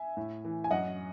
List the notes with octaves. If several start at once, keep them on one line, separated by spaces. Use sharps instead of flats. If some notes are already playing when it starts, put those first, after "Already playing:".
Already playing: E5 G#5
A2
E3
G#5
F#2 D#5 F#5